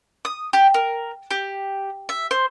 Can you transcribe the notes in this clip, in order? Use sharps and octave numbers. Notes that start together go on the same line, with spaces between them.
D#6
G4
A#4
G4
E5
C5